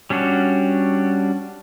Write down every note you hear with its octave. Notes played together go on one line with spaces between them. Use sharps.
G3 C#4 D4 F#4